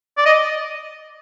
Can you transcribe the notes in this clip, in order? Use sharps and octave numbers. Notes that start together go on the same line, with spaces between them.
D5
D#5